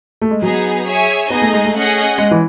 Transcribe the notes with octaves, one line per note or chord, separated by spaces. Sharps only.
A3
G#3
F#3 B3 D#4 G#4
G#4 C#5 E5 G#5
B3 D#4 G#4 D#5
A3
G#3
A3
C#4 G#4 D#5 F#5
G#3
E3